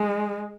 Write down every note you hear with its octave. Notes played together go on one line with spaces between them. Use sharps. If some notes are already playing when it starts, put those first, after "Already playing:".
Already playing: G#3